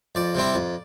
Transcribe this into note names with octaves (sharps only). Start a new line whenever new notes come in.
F2 D5
C3 G3 C4 E4
F2